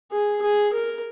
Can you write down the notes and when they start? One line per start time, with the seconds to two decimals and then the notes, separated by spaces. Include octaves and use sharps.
0.12 G#4
0.42 G#4
0.73 A#4